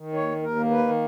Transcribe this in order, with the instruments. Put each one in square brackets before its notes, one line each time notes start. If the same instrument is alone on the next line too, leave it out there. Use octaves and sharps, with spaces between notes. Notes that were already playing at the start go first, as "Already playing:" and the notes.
Already playing: [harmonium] D#3
D#2 C#5
D#2
A#4
A#3
B4
D#3